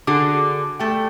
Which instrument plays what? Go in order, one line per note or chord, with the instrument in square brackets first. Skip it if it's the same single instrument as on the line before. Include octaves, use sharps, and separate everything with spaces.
[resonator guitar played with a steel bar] D3 F#4 G#4 [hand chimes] D6
[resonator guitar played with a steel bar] G3 A3 [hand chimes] G5